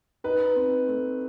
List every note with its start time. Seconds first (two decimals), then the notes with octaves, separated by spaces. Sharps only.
0.24 D#4 B4
0.56 C4
0.88 A3